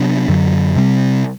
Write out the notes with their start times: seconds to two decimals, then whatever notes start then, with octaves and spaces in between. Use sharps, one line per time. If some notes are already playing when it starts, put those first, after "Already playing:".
Already playing: C3 F#3 B3 D4
0.28 F#2 D3 F#3
0.76 C3 G3 C4